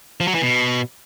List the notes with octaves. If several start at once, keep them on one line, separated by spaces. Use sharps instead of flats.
F3
F#3
E3
B2